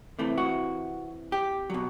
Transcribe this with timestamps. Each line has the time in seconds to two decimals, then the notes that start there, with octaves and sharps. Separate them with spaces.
0.19 C3 E3 A3
0.38 F#4
1.32 G4
1.70 B2 F#3